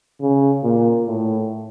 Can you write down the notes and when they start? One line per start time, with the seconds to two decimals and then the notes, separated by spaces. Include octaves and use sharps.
0.21 C#3
0.64 A#2
1.07 A2